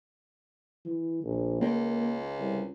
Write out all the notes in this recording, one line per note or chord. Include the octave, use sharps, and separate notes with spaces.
E3
A#1
C#2 A#3
C2